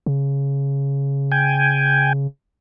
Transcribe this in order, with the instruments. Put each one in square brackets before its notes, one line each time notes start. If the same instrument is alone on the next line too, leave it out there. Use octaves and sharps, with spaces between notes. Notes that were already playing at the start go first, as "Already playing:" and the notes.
[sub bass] C#3
[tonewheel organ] G5 G#5